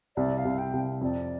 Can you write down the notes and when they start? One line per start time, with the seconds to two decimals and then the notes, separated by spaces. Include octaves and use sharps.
0.16 C2 D5
0.38 F5
0.45 C2
0.59 G5
0.73 C2
1.01 F2 D5